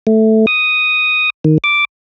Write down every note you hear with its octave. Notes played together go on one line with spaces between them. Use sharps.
A3
D#6
D#3
D6